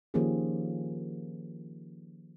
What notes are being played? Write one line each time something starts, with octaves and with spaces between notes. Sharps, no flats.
D#3 F3 A#3 C#4 G4 G#4